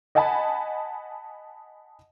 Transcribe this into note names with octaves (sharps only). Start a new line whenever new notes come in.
D#5 F#5 G#5 A5 B5